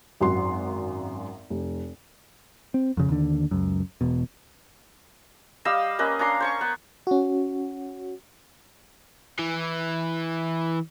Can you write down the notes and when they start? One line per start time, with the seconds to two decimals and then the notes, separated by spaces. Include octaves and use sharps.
0.20 G#1 F#2 F#4 C6
1.50 F1
2.74 C4
2.97 F2 C#3
3.09 D#2 D3
3.51 C#2 F#2
4.01 E1 B2
5.65 G3 D#5 F5 E6
5.99 A#3 C#4 B4 D#5
6.19 C#4 D4 A#5 C6
6.40 C5 C#5 C#6
6.61 B3
7.07 C#4 F#4
9.39 E3